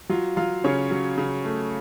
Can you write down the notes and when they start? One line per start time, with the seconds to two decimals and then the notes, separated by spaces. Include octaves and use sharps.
0.09 F#3 F4 F5
0.36 F#3 F4 F5
0.64 C#3 C#4 C#5
0.91 F#3
1.18 C#3
1.45 A3